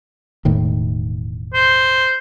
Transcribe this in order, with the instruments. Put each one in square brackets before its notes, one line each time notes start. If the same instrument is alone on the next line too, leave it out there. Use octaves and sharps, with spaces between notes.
[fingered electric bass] E1 A2 D#3
[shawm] C5